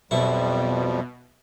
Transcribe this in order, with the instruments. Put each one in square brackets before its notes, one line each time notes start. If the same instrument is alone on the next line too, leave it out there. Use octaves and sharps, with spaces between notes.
[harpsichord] B1 E4 C#6 [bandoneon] F2 F3 G3 [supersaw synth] B2